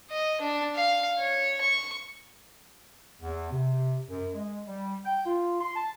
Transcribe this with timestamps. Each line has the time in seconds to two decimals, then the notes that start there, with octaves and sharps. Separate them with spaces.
0.11 D#5
0.41 D4
0.75 F5
1.19 C#5
1.61 C#6
3.21 E2
3.52 C3
4.08 F#2
4.34 G#3
4.67 G3
5.05 G5
5.26 F4
5.61 C6
5.76 A5